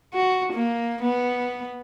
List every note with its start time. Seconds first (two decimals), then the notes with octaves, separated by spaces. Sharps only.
0.14 F#4
0.53 A#3
1.02 B3